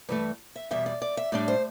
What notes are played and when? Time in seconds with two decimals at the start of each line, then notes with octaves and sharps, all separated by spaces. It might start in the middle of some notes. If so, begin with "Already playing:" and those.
0.09 G2 E3 A3 B4
0.56 E5
0.71 E2 B2 G3 E5
0.86 D5
1.02 D5
1.17 E5
1.32 A2 G3 D4 D5
1.48 C5